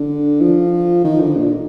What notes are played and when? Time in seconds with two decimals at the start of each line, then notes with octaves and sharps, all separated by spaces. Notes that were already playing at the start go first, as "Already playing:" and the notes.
Already playing: D3
0.41 F3
1.04 D#3
1.20 D3
1.36 A#2